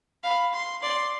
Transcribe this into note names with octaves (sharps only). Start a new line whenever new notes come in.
F5 B5
C6
D5 C6